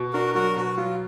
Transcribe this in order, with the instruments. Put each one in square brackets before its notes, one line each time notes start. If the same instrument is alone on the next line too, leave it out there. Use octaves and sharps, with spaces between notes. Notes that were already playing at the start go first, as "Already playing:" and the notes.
Already playing: [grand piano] B2
[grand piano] D4 [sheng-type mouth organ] F#4 A#4
[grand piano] F#3 [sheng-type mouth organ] F#4 A#4
[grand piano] B2 [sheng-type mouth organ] F#4
[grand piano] F#3 [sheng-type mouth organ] F4